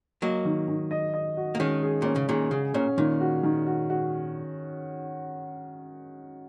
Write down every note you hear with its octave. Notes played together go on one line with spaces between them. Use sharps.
F#3 A#3 D#5
D#3
D#3
D#5
D#5
F#4
A#3
D#3 G#3 C#4
G#4
A#2 C#4
C#3
A#2 D#3 G#4
C#3 G#4
A#2 C#4
A#2 D#3
F#4
D#3
F#4
F#4